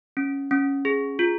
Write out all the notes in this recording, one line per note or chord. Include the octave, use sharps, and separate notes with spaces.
C#4
C#4
G#4
F4